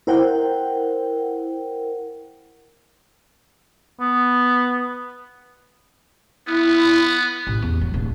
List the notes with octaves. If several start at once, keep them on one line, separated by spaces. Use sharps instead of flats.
E4 A#4 C5 F#5 G5
B3
B3 E4
A1
E2
F#3
D1